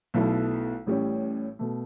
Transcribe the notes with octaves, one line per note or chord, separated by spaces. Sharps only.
B1 B2 A3 E4 A4
A1 A2 G3 C#4 G4
B2 A3